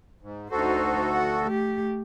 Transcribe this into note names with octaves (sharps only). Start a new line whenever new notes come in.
G#2
D2 D#4 F#4 A4 C5
F#5
A3 G4